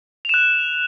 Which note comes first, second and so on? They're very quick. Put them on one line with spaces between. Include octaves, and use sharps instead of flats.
F7 E7 F#6